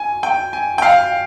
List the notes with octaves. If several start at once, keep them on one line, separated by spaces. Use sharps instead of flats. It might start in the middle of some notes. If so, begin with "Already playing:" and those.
Already playing: G#5
G5
G#5
G5
F5